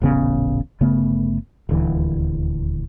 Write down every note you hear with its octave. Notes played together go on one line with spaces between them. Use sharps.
D#1 A1 C#3 B3
G1 C#3 A3 B3
D#1 D2 E3